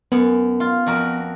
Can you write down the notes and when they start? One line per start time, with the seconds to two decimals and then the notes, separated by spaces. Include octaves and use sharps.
0.12 F#2 B3
0.60 F4
0.87 F2 F#4 A#4